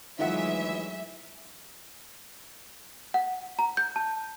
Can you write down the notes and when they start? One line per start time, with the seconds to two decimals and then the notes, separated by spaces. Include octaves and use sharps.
0.19 D2 D#3 E3 F#3 G#3 F4 E5 F#5
3.14 F#5
3.59 A#5
3.77 G6
3.96 A5